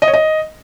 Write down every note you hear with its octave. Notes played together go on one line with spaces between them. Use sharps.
D#5
C#5
D#5